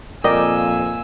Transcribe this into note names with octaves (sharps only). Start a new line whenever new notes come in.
F2 A#2 A#4 D5 D#5 G5 G#5 E6